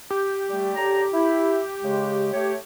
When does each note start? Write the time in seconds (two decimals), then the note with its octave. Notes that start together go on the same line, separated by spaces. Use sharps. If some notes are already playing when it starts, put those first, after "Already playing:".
0.11 G4
0.48 G3 A3
0.75 D3 C#5 A#5
1.12 E4
1.81 C#3 G#3
2.32 A3 C#5